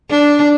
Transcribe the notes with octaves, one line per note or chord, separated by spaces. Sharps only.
D4